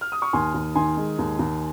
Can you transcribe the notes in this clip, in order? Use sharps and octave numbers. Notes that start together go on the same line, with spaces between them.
F6
D#6
C#6
D#2 G#5 C6
D#2
D#3 G#5 C6
G#3
D#2
D#2